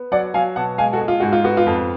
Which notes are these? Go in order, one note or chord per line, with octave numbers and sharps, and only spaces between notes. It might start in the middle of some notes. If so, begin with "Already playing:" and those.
Already playing: B3
F#3 D5 F#5
F#3 F5 G#5
B2 F#5 A5
G#3 F5 G#5
F#4 A4
G#3
F4
G#2 F#4
F4
B3 F#4
F4
F2